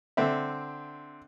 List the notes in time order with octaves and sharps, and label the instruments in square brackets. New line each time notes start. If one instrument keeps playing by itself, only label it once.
[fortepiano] D3 C4 E5